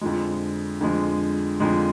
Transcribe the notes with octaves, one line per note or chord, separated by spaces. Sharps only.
F2 D3 F3 G#3
F2 D3 F3 G#3
F2 D3 F3 G#3